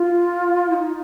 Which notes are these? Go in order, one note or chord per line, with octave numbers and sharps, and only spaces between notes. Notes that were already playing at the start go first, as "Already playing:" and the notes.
Already playing: F4
E4
D#4